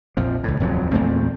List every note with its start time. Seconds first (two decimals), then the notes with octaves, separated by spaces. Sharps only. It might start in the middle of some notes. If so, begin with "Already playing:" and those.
0.17 A#1 F2 F3
0.43 C#2 A2
0.60 D#1 F2 G#2 F#3
0.92 E2 A#2 A3 C4